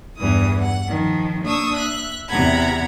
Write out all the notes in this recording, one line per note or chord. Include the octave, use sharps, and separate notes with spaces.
E2 G2 E3 D#6
F#5
D#3 F3
A#3 D4 C#6 D#6 E6
E5 F#6
E2 C3 F#5 A#5 B5 G#6